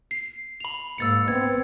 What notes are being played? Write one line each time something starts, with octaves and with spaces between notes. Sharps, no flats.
C7
B5 F7
G#2 A#3 E6 A6 C#7
B3 C4 G#6